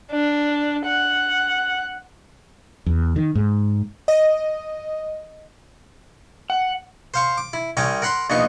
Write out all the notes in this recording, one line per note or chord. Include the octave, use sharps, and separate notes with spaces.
D4
F#5
E2
D#3
G#2
D#5
F#5
C5 F5 C#6
D6
E4
C2 C#4 G5 G#5 A#5
A#4 F#5 B5 C6
A#1 B2 D#4 C#6